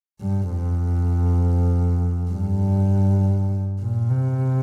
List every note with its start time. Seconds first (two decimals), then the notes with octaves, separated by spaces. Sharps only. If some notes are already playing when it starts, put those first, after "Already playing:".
0.22 G2
0.52 F2
2.31 G2
3.80 A#2
4.09 C3